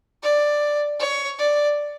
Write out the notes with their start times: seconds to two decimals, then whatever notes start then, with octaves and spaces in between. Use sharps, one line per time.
0.23 D5
0.99 C#5
1.39 D5